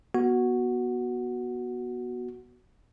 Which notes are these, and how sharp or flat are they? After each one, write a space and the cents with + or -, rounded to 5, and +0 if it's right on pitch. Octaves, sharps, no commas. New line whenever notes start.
B3 -25 F#4 +0